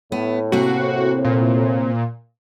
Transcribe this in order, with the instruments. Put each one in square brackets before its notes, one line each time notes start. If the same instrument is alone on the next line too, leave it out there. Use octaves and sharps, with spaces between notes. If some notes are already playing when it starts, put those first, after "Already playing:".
[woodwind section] A2 [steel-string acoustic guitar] B3
[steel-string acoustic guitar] C3 A#3 C4 [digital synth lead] F#4
[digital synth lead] A#2